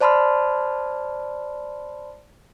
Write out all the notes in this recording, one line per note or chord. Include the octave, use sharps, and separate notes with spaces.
C5 D5 A5 B5 C6 F6